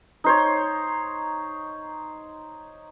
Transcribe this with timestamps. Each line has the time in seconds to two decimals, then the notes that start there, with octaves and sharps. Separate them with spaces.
0.24 D#4 C5 C#5